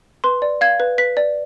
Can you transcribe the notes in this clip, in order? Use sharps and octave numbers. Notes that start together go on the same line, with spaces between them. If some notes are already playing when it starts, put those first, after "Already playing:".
B4 C6
D5
F5 G#6
B4
B4 B6
D5